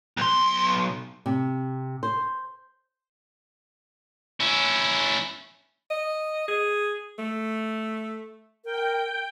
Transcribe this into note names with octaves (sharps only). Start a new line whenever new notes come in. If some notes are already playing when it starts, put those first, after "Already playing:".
B1 C6
C3
C5
C#4 E4
D#5
G#4
A3
A#4 G5